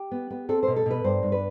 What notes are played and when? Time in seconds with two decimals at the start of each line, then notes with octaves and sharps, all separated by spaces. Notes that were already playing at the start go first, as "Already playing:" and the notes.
Already playing: G4
0.11 B3
0.30 B3
0.49 C4 A4
0.63 B2 C5
0.76 A4
0.86 B2 B4
1.04 G2 C5
1.23 G2
1.32 B4